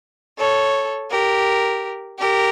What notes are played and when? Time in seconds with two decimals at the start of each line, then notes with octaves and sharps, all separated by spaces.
0.38 A4 C#5
1.10 G4 A#4
2.19 G4 A#4